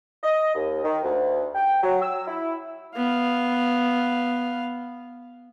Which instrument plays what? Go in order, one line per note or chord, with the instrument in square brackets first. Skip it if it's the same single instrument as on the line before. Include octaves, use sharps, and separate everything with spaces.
[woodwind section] D#5
D#2
D#3
D2
G5
F#3
E6
E4
[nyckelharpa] B3 F5